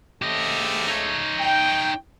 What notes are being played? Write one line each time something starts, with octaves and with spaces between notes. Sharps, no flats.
G#2 C#3 A3 G4 D#5
D#4 C#5
G5